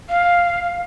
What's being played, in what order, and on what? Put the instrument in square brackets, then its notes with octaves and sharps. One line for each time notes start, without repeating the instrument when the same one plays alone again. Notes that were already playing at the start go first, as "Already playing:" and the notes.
[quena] F5